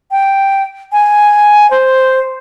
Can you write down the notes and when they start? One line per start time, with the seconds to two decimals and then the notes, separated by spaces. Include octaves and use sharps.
0.11 G5
0.92 G#5
1.71 C5